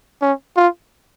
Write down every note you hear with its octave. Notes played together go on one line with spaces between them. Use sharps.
C#4
F4